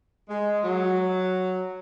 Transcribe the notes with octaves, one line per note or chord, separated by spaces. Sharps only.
G#3
F#3